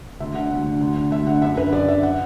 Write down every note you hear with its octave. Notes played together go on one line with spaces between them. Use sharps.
D2 E5
D3 F#5
D2
D3
D2
D3
D2 E5
D3 F#5
F#2 E5
D3 B4
F#2 D5
D3 E5
F#5